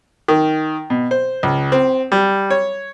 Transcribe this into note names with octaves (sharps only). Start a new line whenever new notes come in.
D#3
B2
C5
C#2
C4
G3
C#5